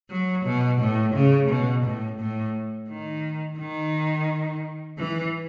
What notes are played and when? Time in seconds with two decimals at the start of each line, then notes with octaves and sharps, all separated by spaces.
0.10 F#3
0.46 B2
0.80 A2
1.15 C#3
1.49 B2
1.84 A2
2.20 A2
2.89 D#3
3.59 D#3
4.98 E3